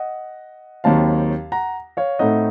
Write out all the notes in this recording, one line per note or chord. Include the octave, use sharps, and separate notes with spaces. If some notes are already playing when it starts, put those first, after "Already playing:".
Already playing: D#5 F#5
D#2 D#3 F#3 C4 F5 A5
F#5 A#5
C#5 F5
A2 A3 C4 D#4 D#5 F#5